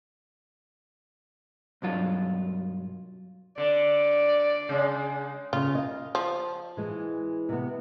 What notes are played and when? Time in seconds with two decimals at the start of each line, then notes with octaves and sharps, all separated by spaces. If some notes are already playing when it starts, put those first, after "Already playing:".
1.82 B1 G2 F#3 F4
3.58 D3 D5
4.69 C#3 G#3
5.53 C#3 F4 C#5
5.75 D#5 F5
6.15 F3
6.77 E3 G#3
7.49 C3 B3